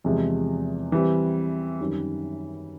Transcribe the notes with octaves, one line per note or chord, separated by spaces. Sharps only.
E2 C3 F3 G#3
E3 G3 C4
F#2 D#3 G3